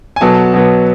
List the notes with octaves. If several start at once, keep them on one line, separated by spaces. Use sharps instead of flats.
G#5
B2 F#3 B3 A4 A5
B2 F#3 B3